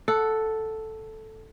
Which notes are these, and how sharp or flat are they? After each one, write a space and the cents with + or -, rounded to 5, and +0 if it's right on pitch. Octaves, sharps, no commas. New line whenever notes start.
A4 +0 F#5 +0